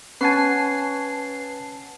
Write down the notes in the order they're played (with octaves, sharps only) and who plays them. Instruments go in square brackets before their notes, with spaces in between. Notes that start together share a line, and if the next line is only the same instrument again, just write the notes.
[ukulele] C#4 [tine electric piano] B4 F#5 G#5 [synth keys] A5 C7